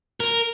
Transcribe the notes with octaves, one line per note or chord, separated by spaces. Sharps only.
A#4